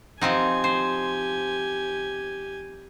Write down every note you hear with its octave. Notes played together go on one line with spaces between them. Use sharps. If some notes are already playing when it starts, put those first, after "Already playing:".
F3 C4 D#4 G4 G#5
C5